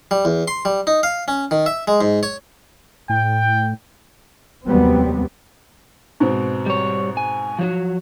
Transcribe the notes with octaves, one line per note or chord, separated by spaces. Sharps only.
G3
E2
C6
G3
D#4
F5
C#4
D#3
E5
G#3
G#2
C#5
A2 G5
F1 D#2 F#3 G3 B3 C4
G#2 B2 C4
G3 C#5
G#5
F3 F#3 F#4